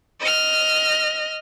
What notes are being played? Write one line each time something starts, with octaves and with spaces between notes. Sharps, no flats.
D#5 F6